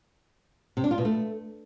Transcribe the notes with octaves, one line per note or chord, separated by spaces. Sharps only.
C3
D4
F4
B2
A3